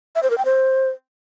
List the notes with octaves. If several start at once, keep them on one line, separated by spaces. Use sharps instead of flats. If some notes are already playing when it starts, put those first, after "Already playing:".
E5
C5
A#4
G5
C5